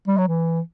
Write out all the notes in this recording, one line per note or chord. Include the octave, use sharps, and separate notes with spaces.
G3
F#3
E3